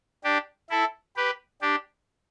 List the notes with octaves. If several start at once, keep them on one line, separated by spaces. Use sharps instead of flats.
D4 G4
E4 A4
G4 B4
D4 G4